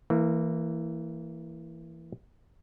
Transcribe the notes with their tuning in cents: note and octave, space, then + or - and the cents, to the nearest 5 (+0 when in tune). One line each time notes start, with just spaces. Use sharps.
E3 +0 A#3 -25